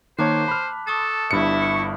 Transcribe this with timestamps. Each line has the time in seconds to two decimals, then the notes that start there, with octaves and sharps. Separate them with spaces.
0.19 D#3 A#3 C5 C#5 A5 D6 F#6
0.48 B5 F6
0.87 A4 C#6 D#6 A6
1.31 G1 G2 E4 C#7
1.61 C#6